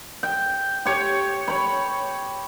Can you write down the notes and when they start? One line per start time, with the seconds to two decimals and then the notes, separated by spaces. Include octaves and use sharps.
0.23 G5
0.86 G4 C#5
1.48 C#5 B5